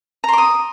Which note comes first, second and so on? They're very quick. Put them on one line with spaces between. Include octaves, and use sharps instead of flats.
A#5 C6 D6 D#6